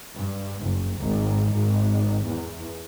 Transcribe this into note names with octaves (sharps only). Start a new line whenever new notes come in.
G2
F#1
G#1
G#1
E2